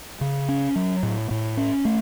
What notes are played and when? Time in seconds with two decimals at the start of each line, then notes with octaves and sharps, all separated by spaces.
0.21 C#3
0.49 C#4
0.76 F#3
1.03 A2
1.31 A2
1.57 C#4
1.85 A3